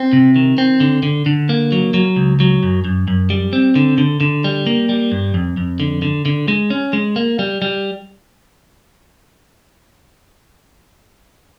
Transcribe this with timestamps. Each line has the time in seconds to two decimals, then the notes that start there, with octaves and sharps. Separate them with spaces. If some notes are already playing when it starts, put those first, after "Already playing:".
Already playing: C4
0.13 C3
0.36 D#3
0.58 C4
0.80 D3
1.03 D3
1.26 D3
1.49 A#3
1.72 F#3
1.94 F#3
2.16 C#2
2.40 F#3
2.63 F#2
2.85 F#2
3.08 F#2
3.30 G3
3.53 C4
3.76 D3
3.98 D3
4.21 D3
4.44 G3
4.66 A#3
4.89 G3
5.12 G2
5.34 F2
5.57 F2
5.80 D3
6.02 D3
6.26 D3
6.48 G#3
6.70 C#4
6.93 G#3
7.16 A#3
7.39 G3
7.62 G3